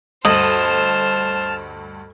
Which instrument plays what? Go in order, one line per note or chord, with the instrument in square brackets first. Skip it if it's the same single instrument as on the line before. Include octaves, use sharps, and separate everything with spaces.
[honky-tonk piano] D2 G2 F#7 [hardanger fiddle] C5 [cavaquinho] D#5 [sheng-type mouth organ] A5 F6